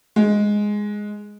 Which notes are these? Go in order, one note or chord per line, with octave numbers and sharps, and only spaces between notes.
G#3